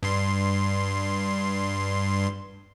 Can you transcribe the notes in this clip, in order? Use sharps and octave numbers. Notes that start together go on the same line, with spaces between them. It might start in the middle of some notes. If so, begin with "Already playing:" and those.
G2 C6